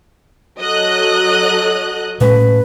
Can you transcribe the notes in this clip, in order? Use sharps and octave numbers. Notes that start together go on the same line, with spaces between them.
F#3 A4 D#5 F#6
A2 G#3 C#4 B4